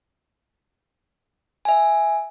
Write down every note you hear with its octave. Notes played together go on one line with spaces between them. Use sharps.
E5 G#5